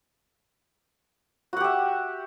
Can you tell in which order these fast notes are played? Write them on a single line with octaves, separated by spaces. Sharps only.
F#4 F#5 G4 E5